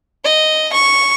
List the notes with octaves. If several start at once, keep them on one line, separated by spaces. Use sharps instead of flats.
D#5
C#6